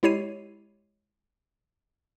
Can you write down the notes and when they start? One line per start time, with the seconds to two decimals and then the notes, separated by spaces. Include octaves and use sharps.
0.03 G#3 E4 G4 C#5 C7 D#7